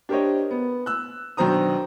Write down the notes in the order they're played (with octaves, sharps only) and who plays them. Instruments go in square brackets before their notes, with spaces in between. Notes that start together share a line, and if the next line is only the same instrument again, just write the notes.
[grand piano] D4 G4 A#4 C5 C#5 D#5
B3
E6 F#6
B1 D#3 D4 C5 A#5 D#6